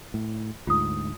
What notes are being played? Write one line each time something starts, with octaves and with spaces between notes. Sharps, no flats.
A2
D2 G#2 F4 D#6